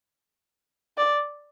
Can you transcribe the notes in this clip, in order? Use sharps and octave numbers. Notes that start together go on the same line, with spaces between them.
D5